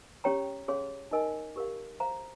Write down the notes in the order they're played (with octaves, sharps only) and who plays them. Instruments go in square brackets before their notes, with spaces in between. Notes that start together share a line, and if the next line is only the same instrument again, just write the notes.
[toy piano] C#4 G4 C#5 G5 A#5
C#4 G#4 C#5 F5 C6
D#4 A#4 D#5 G#5
G4 A#4 F5
C5 F5 A#5